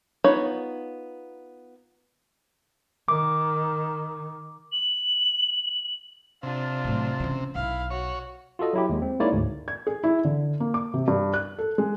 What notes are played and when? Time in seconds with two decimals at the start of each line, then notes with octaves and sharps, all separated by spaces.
0.24 B3 D#4 F4 C#5 B5
3.08 D#3 D6
4.72 F#7
6.43 C3 D4 F4
6.84 A2 F#3
7.20 C#3 E3
7.55 B1 E4 F5
7.91 F#4 C#5
8.59 F4 F#4 A4 D#5
8.73 F#3 E4 G4
8.89 D#2 G#3
9.02 C4
9.20 G#3 A#3 D#4 E4 C#5 D5
9.32 D2 G#2
9.68 G#6
9.87 G#4
10.04 E4
10.25 D3
10.60 A#3
10.74 D6
10.94 C3
11.08 G2
11.34 F#6
11.58 A4
11.78 G#3